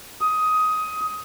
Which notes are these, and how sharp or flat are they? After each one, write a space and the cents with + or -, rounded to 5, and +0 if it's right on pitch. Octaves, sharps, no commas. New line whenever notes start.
D#6 +15